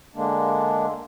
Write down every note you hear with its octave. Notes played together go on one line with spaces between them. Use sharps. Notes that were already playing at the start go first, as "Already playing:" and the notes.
D3 G#3 A#3 D4